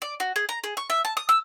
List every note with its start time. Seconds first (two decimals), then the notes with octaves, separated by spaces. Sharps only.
0.02 D5
0.20 F#4
0.36 G#4
0.49 A#5
0.64 G#4
0.77 C#6
0.90 E5
1.05 A5
1.17 D#6
1.29 E6